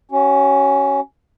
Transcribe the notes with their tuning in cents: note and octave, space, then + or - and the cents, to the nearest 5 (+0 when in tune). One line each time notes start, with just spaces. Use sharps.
C#4 +0 F#4 +35